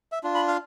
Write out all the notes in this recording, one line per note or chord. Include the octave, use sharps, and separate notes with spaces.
E5
D4 F4
B5
F5